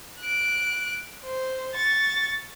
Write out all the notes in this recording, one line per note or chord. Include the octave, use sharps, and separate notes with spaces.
F#6 D7
C5
C#6 A6